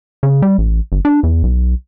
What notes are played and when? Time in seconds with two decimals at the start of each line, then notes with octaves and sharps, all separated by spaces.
0.23 C#3
0.42 G3
0.58 A1
0.92 G1
1.05 D4
1.23 E2
1.43 B1